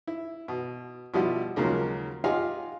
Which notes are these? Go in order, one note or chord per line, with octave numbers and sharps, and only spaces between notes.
E4
B2
B2 F3 G3 E4 F#4
D#2 C#3 F3 F#3 G#3 A#3
F4 G4 D#5 F5 F#5 G#5